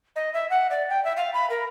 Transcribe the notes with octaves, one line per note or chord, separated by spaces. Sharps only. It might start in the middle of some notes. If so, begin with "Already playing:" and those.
D#5
E5
F#5
D5
G5
E5
F5
B5
A#4